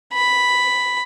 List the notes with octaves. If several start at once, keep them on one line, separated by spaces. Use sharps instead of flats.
B5